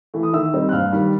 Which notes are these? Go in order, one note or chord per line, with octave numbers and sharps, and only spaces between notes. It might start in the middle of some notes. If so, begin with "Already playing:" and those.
E3 A3
D#6
D#3 E5 E6
G3 C4 D#4
F#6
G2 F5 F6
D#3 G3